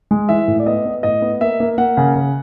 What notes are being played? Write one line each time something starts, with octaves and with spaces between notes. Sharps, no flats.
G#3
E3 E5
A2
D5
B3 D#5
B3
A2 D#5
B3
A#3 E5
A#3
A#3 F#5
C#3
C#3